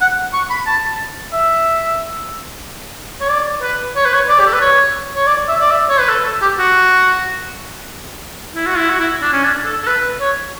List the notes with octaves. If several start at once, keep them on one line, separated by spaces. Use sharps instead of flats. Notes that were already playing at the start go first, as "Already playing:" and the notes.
F#5
C#6
B5
A5
E5
C#5
D5
B4
C#5
B4
C#5
D5
G4
A4
B4
C#5
C#5
D5
E5
D5
E5
C#5
B4
A4
A4
G4
F#4
E4
F#4
E4
F#4
E4
D4
C#4
D4
A4
A4
B4
C#5